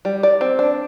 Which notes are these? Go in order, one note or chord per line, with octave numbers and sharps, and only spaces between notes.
G3
D5
C4
D4